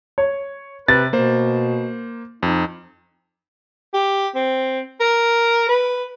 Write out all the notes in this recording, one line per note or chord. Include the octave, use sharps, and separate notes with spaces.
C#5
C3 B4 A6
B2 A#3 C5
F2 D#4
G4
C4
A#4
B4